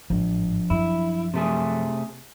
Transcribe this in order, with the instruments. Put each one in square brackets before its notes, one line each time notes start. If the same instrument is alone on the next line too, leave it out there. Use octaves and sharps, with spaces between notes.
[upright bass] A1 G#2 [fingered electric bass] F3 D4
[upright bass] F#2 [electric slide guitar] E4
[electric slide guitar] C3 A3 G#4